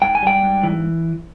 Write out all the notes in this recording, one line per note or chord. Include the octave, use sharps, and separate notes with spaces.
G#2 G5
G#5
G3 G5
G#2
E3